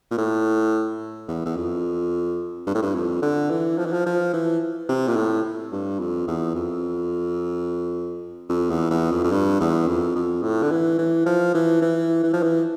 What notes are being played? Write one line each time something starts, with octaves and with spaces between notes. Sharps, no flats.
A#2
A2
E2
E2
F2
G2
A2
G2
F2
D3
E3
F3
E3
F3
F3
E3
C3
A#2
A2
G2
F2
E2
F2
F2
E2
E2
F2
F2
G2
E2
F2
F2
A2
D3
E3
E3
F3
E3
E3
E3
F3
E3